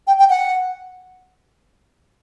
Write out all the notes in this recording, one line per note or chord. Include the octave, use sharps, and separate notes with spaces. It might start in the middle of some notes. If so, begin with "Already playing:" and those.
G5
G5
F#5